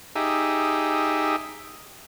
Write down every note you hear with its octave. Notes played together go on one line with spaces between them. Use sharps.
D#4 G4 G#4 E5